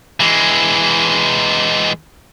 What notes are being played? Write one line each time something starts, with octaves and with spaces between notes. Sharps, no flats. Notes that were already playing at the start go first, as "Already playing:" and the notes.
E3 G#3